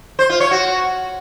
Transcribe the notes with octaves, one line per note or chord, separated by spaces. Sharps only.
C5
F4
C#5
F#4